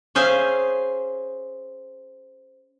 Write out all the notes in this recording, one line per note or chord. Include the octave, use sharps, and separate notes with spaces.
C#4 G#4 C5 E5 F5 G#5